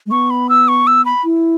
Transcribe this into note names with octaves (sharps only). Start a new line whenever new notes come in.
G#3
B3 C#6
B5
E6
C#6
E6
B5
E4